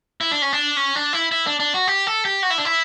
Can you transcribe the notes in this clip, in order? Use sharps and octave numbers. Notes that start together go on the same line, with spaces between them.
E4
D4
C#4
D4
C#4
D4
E4
E4
D4
D4
F#4
G4
A4
G4
F#4
E4
D4
E4